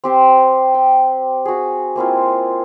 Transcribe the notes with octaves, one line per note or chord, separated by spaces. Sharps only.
C4 G4 C5
G5
F#4 G#4
A#3 C4 E4 F4